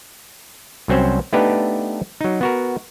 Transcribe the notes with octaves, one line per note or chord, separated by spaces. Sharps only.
C2 F#3 C4 C#4 C5
A3 B3 D4 D#4 G4 B4
F#3 D#4
B3 F#4 A#4